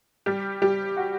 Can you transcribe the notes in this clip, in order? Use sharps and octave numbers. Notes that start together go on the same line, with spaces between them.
G3 G4
G3 G4
F#4